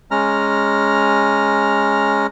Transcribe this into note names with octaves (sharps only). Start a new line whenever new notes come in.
G#3 C#4 A#5 F6